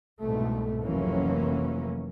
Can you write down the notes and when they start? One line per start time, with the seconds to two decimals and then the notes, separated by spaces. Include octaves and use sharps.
0.21 C2 G#2 B2 A3
0.83 F1 E3 F#3 A#3 C#4